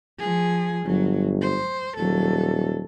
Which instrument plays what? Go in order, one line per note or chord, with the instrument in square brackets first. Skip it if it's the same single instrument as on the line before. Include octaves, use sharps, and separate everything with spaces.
[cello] F3 G#4
[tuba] G1 [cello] F#3
[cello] C5
[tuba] D#1 [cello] F#3 A4